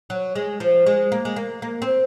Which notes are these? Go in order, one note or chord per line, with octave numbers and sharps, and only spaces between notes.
F#3
G#3
F3
G#3
A#3
G#3
A#3
A#3
C4